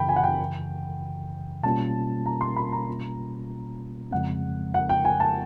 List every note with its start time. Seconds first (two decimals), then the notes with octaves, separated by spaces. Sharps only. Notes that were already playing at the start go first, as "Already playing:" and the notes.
Already playing: F#2 C#3 E3 G5 B5
0.09 G#5
0.16 F#5
0.24 G5
1.63 B2 G3 A#3 C#4 F4 A5
2.26 A#5
2.41 C6
2.56 B5
2.72 A#5
4.11 F2 C#3 F3 G#3 C4 F#5
4.74 F#5
4.89 G5
5.05 G#5
5.20 A5